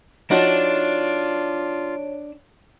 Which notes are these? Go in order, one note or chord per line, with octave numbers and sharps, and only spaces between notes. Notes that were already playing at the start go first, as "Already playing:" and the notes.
F3 D4 D#4 F4 F#4 C#5